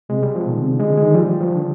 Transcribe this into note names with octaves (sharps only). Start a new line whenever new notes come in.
C3 G#3
G3
F3
B2
D#3
C3
D3
G#3
D3
D#3 G#3
D#3
F3 G3
F3
F3
D3